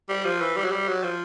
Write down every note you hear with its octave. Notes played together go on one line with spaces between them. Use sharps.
G3
F3
E3
G3
F#3
G3
F#3
F3